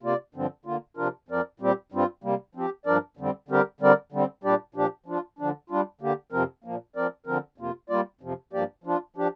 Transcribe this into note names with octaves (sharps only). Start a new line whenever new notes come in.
C3 A#3 F4 D5
G2 D3 F3 C4
D3 A#3 F4
C3 F3 D4 F4 A#4
F2 F3 C4 A#4 D5
A#2 G3 C4 G4
G2 G3 C4 F4
C3 G3 A#3
F3 C4 G4
G2 F3 D4 A#4 D5
F2 D3 G3 C4
D3 G3 C4 G4 A#4
D3 G3 C4 A#4 D5
D3 G3 C4
A#2 G3 D4 G4 D5
A#2 F3 D4 G4
F3 D4 F4
D3 F3 D4
G3 D4 F4
D3 A#3 G4
F2 C3 F3 C4 A#4
A#2 F3 A#3
F3 C4 A#4 D5
D3 F3 C4 A#4
F2 C3 A#3 F4
G3 A#3 F4 D5
F2 C3 F3
G2 F3 A#3 G4 D5
F3 D4 F4
F3 D4 G4